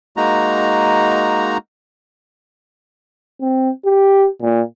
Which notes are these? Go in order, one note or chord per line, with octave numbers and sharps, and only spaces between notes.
G#3 A#3 D#4 F#4 A#5
C4
G4
A#2